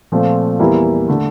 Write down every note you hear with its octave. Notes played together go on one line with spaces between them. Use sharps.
A#2 F3 A3 C4
E2 E3 G3 A#3 E4
D3 A3